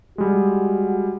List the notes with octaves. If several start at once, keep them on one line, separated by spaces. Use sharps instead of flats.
G3 G#3 F#4